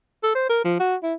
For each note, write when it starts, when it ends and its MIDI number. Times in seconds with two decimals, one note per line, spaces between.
0.24 0.34 69
0.35 0.47 72
0.50 0.62 70
0.65 0.75 53
0.80 0.96 66
1.03 1.15 64